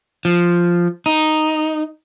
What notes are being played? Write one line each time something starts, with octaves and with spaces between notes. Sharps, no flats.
F3
D#4